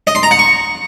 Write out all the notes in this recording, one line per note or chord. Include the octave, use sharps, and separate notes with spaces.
D#5
C6
A#5
F#5
C#6